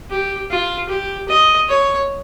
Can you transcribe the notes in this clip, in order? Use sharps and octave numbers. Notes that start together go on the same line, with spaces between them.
G4
F4
G4
D#5
C#5